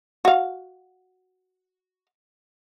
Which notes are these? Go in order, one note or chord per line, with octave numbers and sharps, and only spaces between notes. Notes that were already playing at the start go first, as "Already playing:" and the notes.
F#4 F5